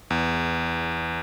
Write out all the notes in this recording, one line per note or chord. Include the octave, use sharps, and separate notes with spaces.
E2